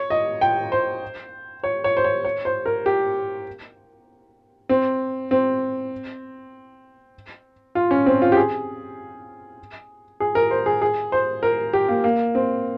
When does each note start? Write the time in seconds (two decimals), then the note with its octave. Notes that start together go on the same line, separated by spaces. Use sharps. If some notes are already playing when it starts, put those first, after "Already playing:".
Already playing: C#5
0.10 D#5
0.41 G5
0.72 C5
1.63 C#5
1.84 C#5
1.97 C5
2.04 C#5
2.24 C#5
2.45 C5
2.66 A#4
2.86 G4
4.69 C4
5.31 C4
7.75 F4
7.91 C#4
8.06 C4
8.22 F4
8.32 G4
8.37 G#4
10.20 G#4
10.35 A#4
10.51 C5
10.66 G#4
10.82 G#4
11.12 C5
11.43 A#4
11.73 G4
11.88 A#3
12.04 A#3
12.35 C4